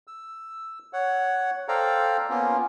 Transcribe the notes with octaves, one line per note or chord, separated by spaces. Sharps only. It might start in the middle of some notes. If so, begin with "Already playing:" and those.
E6
C#5 F#5
A4 C5 D5 F5 G5 A#5
A#3 B3 C#4 F4